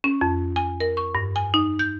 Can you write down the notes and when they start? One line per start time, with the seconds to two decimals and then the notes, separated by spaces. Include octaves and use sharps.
0.04 C#4
0.21 F2
0.56 G#5
0.80 A#4
0.97 C#6
1.15 G2
1.36 G#5
1.54 D#4
1.79 G6